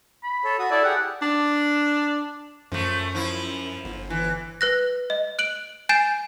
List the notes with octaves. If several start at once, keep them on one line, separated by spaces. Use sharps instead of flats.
B5
A4 C#5
F#4 D#6
E4 A4 D5
G4 G#4 F#5
D4
F#2 F3 A3
F3 E4
G1
E3
B4 F#6 A#6
D#5
F#6 D7 F#7
G#5 G6 A6 C7 D7 E7